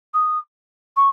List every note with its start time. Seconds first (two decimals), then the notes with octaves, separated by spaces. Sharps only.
0.14 D#6
0.96 C#6